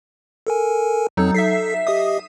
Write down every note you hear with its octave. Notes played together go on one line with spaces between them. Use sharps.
A4 A#4 G#5
F2 F#3 C4 D#4 A4
A4 E5 B6 C7
G4 D#5 E5 D#6